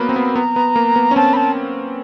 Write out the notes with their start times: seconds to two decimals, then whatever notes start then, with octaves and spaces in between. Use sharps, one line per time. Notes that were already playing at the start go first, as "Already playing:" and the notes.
Already playing: F#3 A#3 B3 B5
0.09 C4
0.16 B3
0.35 B3 A#5
0.56 B3
0.76 A#3
0.96 B3
1.11 C#4
1.16 C4 A5
1.33 B5
1.37 A5